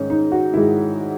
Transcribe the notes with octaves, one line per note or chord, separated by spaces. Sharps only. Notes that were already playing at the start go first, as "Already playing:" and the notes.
Already playing: G#2 D#3 G#3 C#4 D#4
D#4
F#4
G#2 D#3 G#3 E4